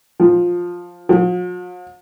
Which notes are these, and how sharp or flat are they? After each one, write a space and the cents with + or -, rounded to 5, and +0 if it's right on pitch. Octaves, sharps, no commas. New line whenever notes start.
F3 +5
F3 +45